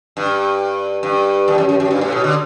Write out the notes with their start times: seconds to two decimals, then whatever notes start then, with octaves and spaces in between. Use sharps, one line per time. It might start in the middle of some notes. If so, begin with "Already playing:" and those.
0.17 G2
1.03 G2
1.48 E2
1.58 F#2
1.69 F#2
1.80 F#2
1.91 G2
2.01 A2
2.12 B2
2.24 D3